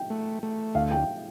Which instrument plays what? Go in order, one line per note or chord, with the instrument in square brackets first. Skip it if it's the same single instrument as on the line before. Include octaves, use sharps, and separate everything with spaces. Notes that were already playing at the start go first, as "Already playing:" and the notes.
Already playing: [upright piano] G5
[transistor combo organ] A3
A3
[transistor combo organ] D2 [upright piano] F5
[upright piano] G5